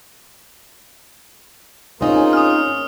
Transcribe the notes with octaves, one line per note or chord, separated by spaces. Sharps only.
A#3 C4 C#4 D#4 F4 G#4
D#6 F6